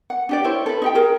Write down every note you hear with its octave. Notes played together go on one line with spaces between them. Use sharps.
F#5
D4 G4 D5
E4 C5 C#5
A4 B4
D#4 G4 G5
G#4 A#4